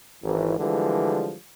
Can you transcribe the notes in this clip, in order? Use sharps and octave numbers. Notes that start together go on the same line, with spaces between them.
G#1 E3
D3 E3 F3 G3 G#3